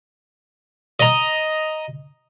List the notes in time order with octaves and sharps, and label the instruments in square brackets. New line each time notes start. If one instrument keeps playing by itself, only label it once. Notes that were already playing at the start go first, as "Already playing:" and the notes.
[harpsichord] D#5 A#5